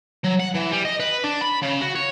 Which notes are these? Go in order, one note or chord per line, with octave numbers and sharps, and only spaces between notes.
F#3
F#5
E3
G3
D#5
B4
D4
B5
C#3
F#4
C#5